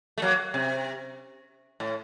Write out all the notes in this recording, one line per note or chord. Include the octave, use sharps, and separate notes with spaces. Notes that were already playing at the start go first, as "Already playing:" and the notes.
A3
F#3 A#3
C3
A2